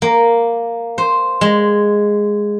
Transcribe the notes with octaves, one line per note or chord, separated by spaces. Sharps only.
A#3
C5
G#3